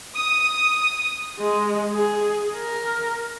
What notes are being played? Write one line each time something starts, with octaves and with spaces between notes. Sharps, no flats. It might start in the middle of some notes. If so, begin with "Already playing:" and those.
D#6
G#3
G#4
A#4